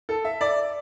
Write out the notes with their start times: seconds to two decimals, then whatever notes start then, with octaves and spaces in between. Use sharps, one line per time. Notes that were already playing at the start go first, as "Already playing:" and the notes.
0.09 A4
0.25 E5
0.41 D5